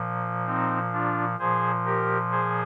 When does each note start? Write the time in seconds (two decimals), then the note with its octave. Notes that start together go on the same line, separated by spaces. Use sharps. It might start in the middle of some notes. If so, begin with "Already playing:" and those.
Already playing: A#2 F3
0.47 C4 D#4
0.92 D4 F4
1.39 A#2 F3 G#4 C5
1.85 G4 A#4
2.31 G#4 C5